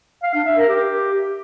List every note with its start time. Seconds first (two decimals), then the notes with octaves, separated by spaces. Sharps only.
0.23 F5
0.34 D4
0.46 E5
0.57 A#4
0.69 G4